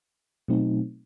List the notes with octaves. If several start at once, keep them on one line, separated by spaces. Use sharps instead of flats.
B2 F#3 A3 C4 D#4